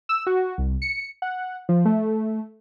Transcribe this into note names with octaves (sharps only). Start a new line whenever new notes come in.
E6
F#4
C2
C#7
F#5
F3
A3